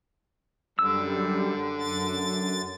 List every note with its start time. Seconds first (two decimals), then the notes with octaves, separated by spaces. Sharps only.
0.79 F#2 D3 G3 E6
1.79 F#2 A6